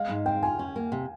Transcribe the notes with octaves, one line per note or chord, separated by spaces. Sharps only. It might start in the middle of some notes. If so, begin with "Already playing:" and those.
Already playing: G#3 F5
G#2
C4 G5
F4 G#5
C#4
A#3
C3